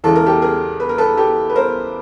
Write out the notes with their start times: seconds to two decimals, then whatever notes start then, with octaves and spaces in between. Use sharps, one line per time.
0.04 E2 C#3 E3 G#3 A4
0.16 A#4
0.26 G4 A4
0.42 G#4 A#4
0.80 B4
0.89 A#4
0.98 A4 B4
1.17 G4 A4
1.49 B4
1.56 A#4 C5